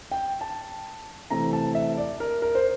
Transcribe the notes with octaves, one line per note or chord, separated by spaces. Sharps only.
G5
A5
C3 E3 A3 C4 A#5
A5
E5
D5
A#4
A#4
C5